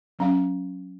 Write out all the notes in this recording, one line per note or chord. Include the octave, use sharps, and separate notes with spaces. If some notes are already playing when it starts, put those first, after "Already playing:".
F#3 C#4 F5